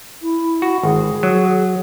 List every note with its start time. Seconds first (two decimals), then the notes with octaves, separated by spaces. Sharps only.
0.22 E4
0.62 F#4
0.83 G#1 G#4
1.23 F#3